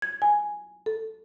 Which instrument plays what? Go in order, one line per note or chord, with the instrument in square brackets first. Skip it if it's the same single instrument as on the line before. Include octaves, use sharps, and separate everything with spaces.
[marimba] G#6
G#5
A4